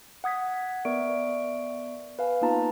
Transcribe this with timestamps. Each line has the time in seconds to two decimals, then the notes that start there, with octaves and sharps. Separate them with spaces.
0.24 F#5 D#6 G#6 B6
0.85 B3 A#4 D5 E5 C#6 D7
2.19 B4 F5 G#5
2.41 A#3 B3 D#4 F4 A5 A#5